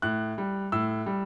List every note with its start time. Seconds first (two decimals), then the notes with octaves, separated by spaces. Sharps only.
0.02 A2 F#6
0.38 G3
0.72 A2 E6
1.06 G3